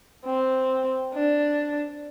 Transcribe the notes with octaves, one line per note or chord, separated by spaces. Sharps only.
C4
D4